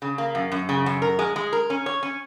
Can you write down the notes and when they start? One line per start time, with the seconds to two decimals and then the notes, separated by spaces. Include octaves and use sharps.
0.02 C#3
0.18 A#3
0.35 F#2
0.52 F#2
0.69 C#3
0.86 F#2
1.02 A#4
1.19 G#3
1.36 G#3
1.53 A#4
1.70 C#4
1.86 C#5
2.03 C#4